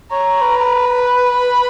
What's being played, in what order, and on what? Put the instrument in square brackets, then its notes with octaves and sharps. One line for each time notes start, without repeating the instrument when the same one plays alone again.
[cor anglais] C#5 [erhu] A#5
[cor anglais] B4
[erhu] B5